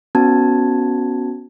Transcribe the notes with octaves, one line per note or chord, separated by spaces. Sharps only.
B3 C#4 F#4 A5 G#6